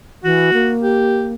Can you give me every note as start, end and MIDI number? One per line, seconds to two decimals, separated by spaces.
0.24 0.50 52
0.24 0.74 66
0.53 1.34 58
0.82 1.33 67